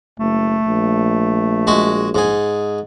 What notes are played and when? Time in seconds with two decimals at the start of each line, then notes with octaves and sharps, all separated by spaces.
0.19 F#1 A3
0.63 A#1
1.67 G#3 F#4
2.15 G#2 G#4